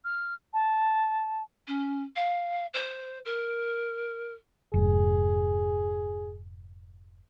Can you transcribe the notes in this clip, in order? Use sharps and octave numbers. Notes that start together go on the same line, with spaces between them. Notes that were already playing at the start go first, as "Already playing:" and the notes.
F6
A5
C#4
F5
C5
A#4
F1 G#2 G#4